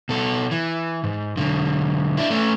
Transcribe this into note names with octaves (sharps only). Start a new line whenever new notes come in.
B2 A4
E3
G#2
B1 D3
D4 E4
A3 C#4